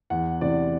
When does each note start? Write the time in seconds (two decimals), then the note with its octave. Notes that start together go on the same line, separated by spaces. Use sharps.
0.10 E2 F#5
0.41 C3 E3 D5